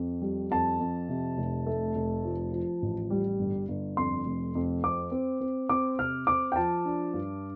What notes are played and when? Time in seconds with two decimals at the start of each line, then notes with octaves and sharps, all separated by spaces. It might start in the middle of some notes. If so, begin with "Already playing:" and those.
Already playing: F2
0.22 G3
0.51 F2 A5
0.80 F2
1.09 C3
1.37 F1
1.66 A3
1.95 F1
2.24 F3
2.52 F3
2.82 A1
3.10 G3
3.39 G1
3.68 G1
3.97 F2 C6
4.26 F1
4.55 F2
4.83 C4 D6
5.11 C4
5.41 C4
5.69 C4 D6
5.99 C3 F6
6.27 C4 D6
6.52 G5
6.56 F3 A5
6.86 D4
7.14 G2